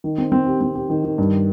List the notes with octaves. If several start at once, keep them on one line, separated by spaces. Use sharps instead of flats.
D#3
C4
C4
G4
C4
G4
D#3
D#3
G2